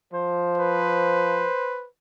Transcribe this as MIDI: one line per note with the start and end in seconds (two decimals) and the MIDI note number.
0.13 1.48 53
0.13 1.84 72
0.58 1.87 71